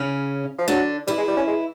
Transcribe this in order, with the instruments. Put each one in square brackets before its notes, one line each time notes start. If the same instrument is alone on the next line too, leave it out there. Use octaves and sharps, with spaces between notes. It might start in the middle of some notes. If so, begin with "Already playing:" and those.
Already playing: [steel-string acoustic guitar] C#3 C#4
[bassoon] F3
[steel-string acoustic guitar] D3 D4 [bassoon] F#3
[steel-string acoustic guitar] E3 E4 [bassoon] G3
[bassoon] G#3
G3
C#4
G#3